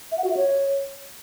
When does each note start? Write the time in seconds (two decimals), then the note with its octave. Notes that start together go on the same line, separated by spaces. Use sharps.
0.12 E5
0.18 F#5
0.24 F#4
0.30 E5
0.37 C#5